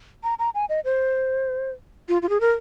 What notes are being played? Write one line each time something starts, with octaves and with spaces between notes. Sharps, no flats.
A#5
A#5
G#5
D#5
C5
F4
F4
G#4
A#4